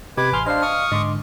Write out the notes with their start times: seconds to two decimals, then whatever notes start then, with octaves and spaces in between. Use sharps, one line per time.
0.17 C3 G4 B4 D#5 B5 D6 G#6
0.33 A1 G#5 C6 F6
0.46 D4 C5 D#5 F5 C6 F6
0.62 A5 C#6 D#6
0.92 G#2 D3 D#5 C6 D6